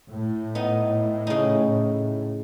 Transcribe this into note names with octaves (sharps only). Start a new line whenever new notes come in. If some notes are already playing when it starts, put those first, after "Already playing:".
A2
B3 D#4
C#3 D#4